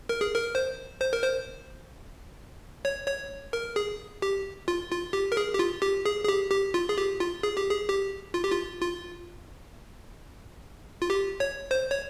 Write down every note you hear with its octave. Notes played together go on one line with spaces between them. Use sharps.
A#4
G#4
A#4
C5
C5
A#4
C5
C#5
C#5
A#4
G#4
G4
F4
F4
G4
A#4
G#4
G4
F4
G4
G#4
G#4
G4
G4
F4
G#4
G4
F4
G#4
G4
G#4
G4
F4
G4
F4
F4
F4
G4
C#5
C5
C#5